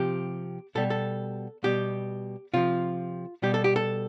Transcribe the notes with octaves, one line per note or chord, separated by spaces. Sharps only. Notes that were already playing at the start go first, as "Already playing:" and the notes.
Already playing: C3 F3 G4
B2 G3 A4
A4
B2 G3 G4
C3 F3 F4
B2 G3 G4
A4
G4
A4